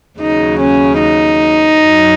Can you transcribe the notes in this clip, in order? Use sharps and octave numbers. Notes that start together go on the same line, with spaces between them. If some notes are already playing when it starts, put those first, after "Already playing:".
D#2 C#3 F#3 D#4
C#4
D#4
F#2 F#3